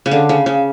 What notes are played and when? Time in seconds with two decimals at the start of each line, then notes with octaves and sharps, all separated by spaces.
0.06 C#3
0.11 D3
0.29 C#3
0.46 C#3